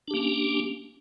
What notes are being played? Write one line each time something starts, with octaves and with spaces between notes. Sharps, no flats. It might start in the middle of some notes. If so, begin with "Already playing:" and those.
A#3 C#4 D4 G4